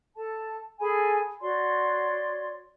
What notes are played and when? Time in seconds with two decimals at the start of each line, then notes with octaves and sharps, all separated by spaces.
0.16 A4 A5
0.79 G#4 A4 G#5 B5
1.40 F#4 C#5 D5 C6